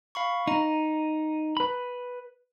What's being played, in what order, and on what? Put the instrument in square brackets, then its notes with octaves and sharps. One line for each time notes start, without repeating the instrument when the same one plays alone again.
[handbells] F5 B5 C#6
[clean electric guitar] D#4 [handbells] A#5
[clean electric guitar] B4 B5